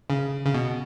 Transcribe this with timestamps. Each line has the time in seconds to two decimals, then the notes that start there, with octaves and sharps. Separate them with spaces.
0.10 C#3
0.46 C#3
0.54 B2